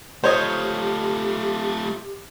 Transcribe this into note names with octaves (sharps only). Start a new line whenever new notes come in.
A3 F4 G4 C5 C#5 D#5